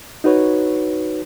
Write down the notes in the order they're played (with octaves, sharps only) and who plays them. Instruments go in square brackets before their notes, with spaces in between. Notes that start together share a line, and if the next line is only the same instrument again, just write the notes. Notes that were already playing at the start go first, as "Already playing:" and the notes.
[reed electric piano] D#4 F#4 B4 C#5